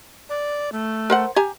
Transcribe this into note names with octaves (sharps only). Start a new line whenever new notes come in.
D5
A3
A#4 C5 F#5
G4 G#5 A#5